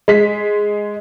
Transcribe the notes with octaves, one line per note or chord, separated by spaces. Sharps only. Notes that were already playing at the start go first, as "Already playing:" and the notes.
G#3 B6